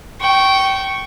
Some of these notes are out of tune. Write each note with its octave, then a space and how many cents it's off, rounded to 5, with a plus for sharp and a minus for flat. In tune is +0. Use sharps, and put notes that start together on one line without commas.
G5 -20 C#6 -5